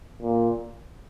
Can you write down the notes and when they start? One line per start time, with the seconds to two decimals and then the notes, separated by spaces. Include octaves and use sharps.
0.22 A#2